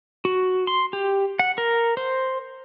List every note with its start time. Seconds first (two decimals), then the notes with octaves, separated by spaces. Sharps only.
0.25 F#4
0.67 C6
0.93 G4
1.39 F#5
1.58 A#4
1.97 C5